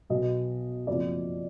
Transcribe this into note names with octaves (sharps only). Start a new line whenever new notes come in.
B1 B2 F#3 D#5
F#1 F2 F3 D5